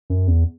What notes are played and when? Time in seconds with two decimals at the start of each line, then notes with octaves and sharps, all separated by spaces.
0.10 F#2
0.28 E2